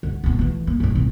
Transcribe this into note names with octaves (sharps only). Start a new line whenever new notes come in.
D3 B3
D1 B3
E3 A3
A#3
G#2 A#3
D1 G#1